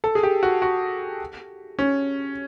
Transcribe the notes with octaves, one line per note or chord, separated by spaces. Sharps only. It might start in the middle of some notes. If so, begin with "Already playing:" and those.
A4
G#4
G4
F#4
F#4
C#4